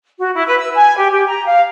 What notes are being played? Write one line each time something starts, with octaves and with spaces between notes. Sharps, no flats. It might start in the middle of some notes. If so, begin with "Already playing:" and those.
F#4
E4
B4
E6
G#5
G4
G4
A#5
F5